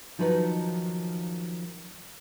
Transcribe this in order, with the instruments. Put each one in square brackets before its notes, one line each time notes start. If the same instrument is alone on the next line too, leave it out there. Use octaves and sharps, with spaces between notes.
[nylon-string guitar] D#3 F3 F#3 D#4 B4